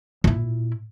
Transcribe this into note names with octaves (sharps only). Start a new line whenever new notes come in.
A#2 E4